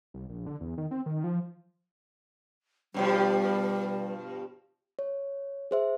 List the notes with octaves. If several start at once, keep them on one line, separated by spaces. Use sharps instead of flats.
C2
A#1
D3
E2
D#3
C4
D#3
F3
G2 B2 F3 G3
C#5
G#4 C5 E5